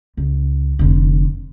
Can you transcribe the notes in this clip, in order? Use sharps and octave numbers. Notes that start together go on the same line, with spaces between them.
C#2
F1 D3